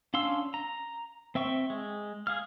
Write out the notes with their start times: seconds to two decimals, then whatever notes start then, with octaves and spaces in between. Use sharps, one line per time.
0.14 C#4 D4 F5 C6 E6
0.54 A#5
1.35 C4 E5 G5 C#6
1.70 G#3
2.27 G#4 F5 F6